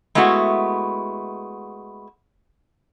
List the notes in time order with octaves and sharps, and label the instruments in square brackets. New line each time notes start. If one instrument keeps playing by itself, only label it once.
[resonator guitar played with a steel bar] G#3 A3 B3 E4 F#4